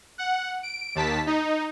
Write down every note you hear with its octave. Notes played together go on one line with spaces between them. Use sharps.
F#5
D7
D#2 A5 B6
D#4